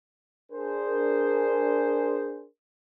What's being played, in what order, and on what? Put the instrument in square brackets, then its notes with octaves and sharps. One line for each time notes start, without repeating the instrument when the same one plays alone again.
[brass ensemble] D4 G#4 A#4 C5